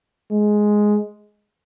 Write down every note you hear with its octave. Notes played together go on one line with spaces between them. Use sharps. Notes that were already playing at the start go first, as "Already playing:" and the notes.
G#3